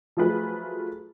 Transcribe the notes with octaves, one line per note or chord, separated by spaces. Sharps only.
F3 F#3 A3 F4 G#4 B4